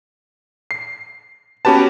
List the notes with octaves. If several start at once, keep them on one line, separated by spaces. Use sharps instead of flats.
C7
B3 C#4 F#4 G4 B4 A5